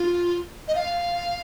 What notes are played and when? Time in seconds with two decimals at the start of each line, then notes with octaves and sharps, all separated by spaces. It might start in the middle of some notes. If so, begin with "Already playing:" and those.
Already playing: F4
0.68 D#5
0.75 F5